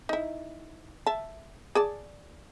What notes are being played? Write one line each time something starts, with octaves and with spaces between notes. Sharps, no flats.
D#4 E4
E5 A5
G#4 D5 A5